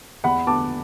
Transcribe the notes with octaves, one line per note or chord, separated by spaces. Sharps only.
E2 F#5 B5
D3 B3 D4 A5 D6